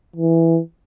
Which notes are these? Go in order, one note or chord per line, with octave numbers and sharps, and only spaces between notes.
E3